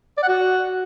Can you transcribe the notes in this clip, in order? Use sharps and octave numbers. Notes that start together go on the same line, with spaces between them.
D5
F#5
F#4